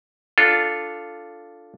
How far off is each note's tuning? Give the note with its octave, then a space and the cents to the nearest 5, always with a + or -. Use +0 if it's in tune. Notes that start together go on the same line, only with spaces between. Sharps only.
D4 +0 F4 +0 A4 +0